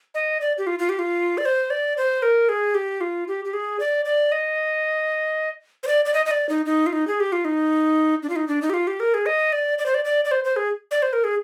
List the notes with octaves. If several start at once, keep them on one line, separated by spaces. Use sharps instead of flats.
D#5
D5
G4
F4
F4
G4
F4
D5
C5
D5
C5
A#4
G#4
G4
F4
G4
G4
G#4
D5
D5
D#5
C5
D5
D5
D#5
D#5
D5
D#4
D#4
F4
D#4
G#4
G4
F4
D#4
D4
F4
D#4
D4
D#4
G4
F4
G4
A#4
G#4
D#5
D5
D5
C5
D5
D5
D5
C5
C5
G#4
D5
C5
A#4
G#4